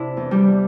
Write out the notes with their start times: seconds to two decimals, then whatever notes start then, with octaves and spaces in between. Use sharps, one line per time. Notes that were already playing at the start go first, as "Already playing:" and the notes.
Already playing: C3 D4 E4
0.17 E2
0.31 G3 G4